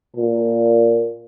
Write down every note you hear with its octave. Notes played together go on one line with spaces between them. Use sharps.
A#2